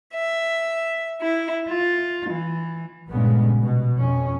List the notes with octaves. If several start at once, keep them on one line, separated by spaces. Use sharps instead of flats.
E5
E4
F4
E3
A#1 G2 A#2 C#3 G#3 B3
B2
F2 C#4